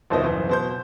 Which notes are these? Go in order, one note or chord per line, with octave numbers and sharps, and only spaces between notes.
G1 D#2 B2 C5 D#5 E5
F#1 E3
B2 C5 G6